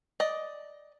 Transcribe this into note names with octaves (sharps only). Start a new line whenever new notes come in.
D5 D#5